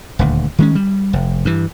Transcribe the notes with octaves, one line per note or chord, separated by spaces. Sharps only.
D#1 D2
D#3 G#3 C#4
G3
F1
G2 E3